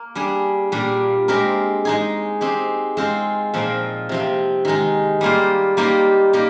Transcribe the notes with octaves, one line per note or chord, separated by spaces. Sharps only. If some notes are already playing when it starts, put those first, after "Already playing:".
Already playing: A#3
G3 D4 G#4
A#2 G3 D4
G#3 C4 G4 A#4
G#3 D#4 G#4
G#3 C4 G4
G#3 C4 F4 C5
A#2 F3 C4 D#4 A#4
C3 F3 C4
D#3 G#3 D#4
G3 A#3 F4 C5
G3 A#3 D#4 G4 C5
A#3 D#4 G4